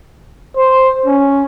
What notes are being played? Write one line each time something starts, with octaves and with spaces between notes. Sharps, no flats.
C5
C#4